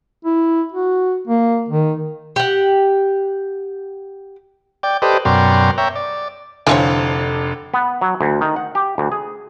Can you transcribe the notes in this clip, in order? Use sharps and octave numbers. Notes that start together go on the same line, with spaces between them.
E4
F#4
A#3
D#3
G4 F#5
D5 G5
G4 A4 B4 C5 D5 D#5
F#2 B2 A#4 D5 G5 C6
C#5 E5 G5 A#5
D5
F1 D3 E3 F3 C#5
B3
F#3
D2
D#3
F#5
G4
D2
G#4